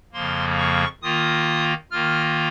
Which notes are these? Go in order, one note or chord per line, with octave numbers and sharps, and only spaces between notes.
F2 C#3 F3 A#3 C6
C#6
D#3 A#3 F4 D#6
D#3 A#3 F4 F6